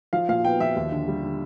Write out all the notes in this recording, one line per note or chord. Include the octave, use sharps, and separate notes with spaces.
F3 F5
A#2 F5
B3 G5
F3 E5
D#2
D3
G3
D3